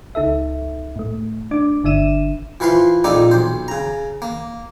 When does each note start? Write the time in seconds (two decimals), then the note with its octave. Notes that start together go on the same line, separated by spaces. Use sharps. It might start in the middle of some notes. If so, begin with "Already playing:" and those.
0.15 C#2 D#4 A4 E5
0.96 A2 A3
1.51 D4 D6
1.84 G1 D3 D4 E5 D#7 E7
2.60 E3 F3 B4 F5 C6
3.04 A#1 F2 A#3 D#4 A4 D5
3.31 B1 C5
3.68 C#3 A#5
4.22 A#3